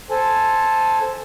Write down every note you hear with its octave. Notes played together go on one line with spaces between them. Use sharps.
A4 C5 G#5 A5